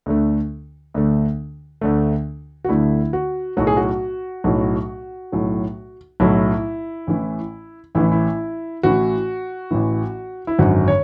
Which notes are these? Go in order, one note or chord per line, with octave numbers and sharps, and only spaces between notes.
D2 D3 A3
D2 D3 A3
D2 D3 A3
F#4
D2 D3 A3 E4
F#4
B1 A2 F#3 F#4
G#4
F#4
B1 A2 F#3
B1 A2 F#3
B1 A2 F#3 E4
A1 A2 E3
A1 A2 E3 E4
E4
A1 A2 E3 F#4
A1 A2 E3
E4
G#1 F#2 D3 F#4
C#5